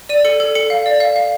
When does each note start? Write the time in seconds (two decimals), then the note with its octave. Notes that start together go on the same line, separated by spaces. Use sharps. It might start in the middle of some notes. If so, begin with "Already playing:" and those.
0.09 D5 D#7
0.25 A4 C#7
0.40 A4
0.55 A4 C#7
0.70 F5
0.86 D5
1.00 F5
1.16 F5